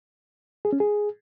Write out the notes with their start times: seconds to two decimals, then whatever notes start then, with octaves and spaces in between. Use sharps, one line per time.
0.65 G#4
0.73 C#4
0.80 G#4